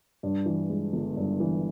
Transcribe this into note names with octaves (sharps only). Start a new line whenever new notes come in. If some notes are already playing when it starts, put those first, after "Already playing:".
G2
E3
G#3
G1
G2
E3